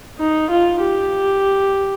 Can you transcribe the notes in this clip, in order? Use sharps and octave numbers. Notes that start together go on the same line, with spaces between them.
D#4
F4
G4